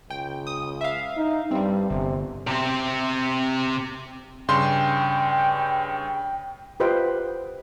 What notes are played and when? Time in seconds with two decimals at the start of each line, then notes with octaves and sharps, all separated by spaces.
0.10 C#2 G5
0.47 D#6
0.81 E5 F5
1.17 D#4
1.51 G2 G3 C4
1.90 G1 C3
2.47 C3 C4
4.48 G2 C#3 G5 C6
6.80 F4 G4 B4 C5 D#5 G5